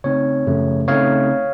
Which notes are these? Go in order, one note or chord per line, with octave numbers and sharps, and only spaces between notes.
C#3 A3 C4 D#4 C#5
F#2 C#3 F3 A3
C#3 A3 C4 D#4 C#5 F5